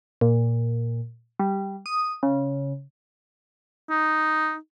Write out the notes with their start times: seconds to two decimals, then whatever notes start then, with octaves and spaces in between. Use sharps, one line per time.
0.21 A#2
1.40 G3
1.86 D#6
2.23 C#3
3.90 D#4